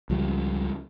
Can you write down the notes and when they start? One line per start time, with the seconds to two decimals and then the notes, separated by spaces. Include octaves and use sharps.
0.10 C#2 F3 G3